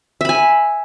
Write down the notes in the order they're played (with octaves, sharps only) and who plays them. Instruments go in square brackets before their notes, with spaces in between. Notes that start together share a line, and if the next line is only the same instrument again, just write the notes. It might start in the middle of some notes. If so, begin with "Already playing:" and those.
[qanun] E5
B5
G#5